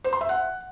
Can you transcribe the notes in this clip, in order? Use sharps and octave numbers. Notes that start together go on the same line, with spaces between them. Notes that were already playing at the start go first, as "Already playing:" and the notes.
C5
C6
E5
F#5